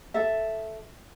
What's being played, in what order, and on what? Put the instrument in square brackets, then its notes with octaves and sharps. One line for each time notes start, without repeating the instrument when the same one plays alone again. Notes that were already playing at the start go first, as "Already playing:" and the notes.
[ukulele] A4 E5